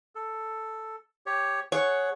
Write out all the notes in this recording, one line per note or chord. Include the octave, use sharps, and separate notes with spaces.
A4
G4 C#5
G#4 C#5 F#5